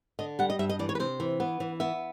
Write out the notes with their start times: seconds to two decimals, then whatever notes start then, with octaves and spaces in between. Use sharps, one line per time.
0.19 D3 D#5
0.39 G3 F#5
0.50 D#5
0.59 G2 E5
0.69 D#5
0.79 E3 D5
0.89 C#5
0.95 B4
1.00 C3 C5
1.20 E3
1.40 B3
1.60 E3
1.80 B3 E5